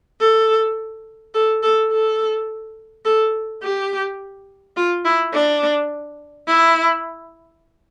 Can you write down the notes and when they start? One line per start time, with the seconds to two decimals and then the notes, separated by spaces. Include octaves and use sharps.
0.20 A4
1.34 A4
1.63 A4
1.91 A4
3.05 A4
3.62 G4
4.76 F4
5.05 E4
5.33 D4
6.47 E4